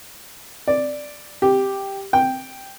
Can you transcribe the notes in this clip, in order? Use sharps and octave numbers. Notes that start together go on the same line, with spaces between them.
D5
G4
G5